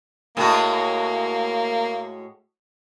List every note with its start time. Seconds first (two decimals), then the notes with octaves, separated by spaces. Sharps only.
0.37 A2 G#3 A#3 F#4